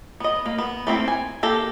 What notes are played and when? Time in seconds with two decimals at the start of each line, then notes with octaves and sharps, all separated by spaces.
0.20 B3 D#5
0.46 A#3
0.58 B3
0.87 A3 A#3 C4 E4
1.08 G#5
1.43 A#3 G4 A4